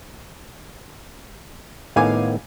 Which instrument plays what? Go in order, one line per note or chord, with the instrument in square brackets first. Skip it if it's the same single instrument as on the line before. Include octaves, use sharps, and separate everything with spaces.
[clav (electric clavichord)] A2 D#3 B3 [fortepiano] F5 G#5 D6